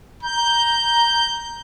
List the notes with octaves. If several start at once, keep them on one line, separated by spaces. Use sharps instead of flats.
A#5 G6